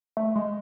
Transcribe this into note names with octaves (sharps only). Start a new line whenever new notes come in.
A3
G#3